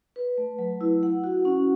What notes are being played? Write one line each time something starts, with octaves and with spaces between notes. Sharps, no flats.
B4
A3
F#3
E4
F#5
F#4
C#4